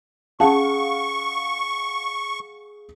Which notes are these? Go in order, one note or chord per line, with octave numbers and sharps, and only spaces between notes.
C#4 G#4 F5 F#5 A5 C#6